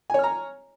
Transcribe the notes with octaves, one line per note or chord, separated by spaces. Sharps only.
C#5 G#5 A#5 F6